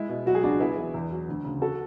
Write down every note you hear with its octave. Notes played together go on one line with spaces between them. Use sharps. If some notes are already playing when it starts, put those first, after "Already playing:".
Already playing: G#3 E4
B2
F#3 F#4
G#4
C#2 D4 F#4
B3 E4 G#4
E3
E2
F#3
D2
C#3
F#4 A4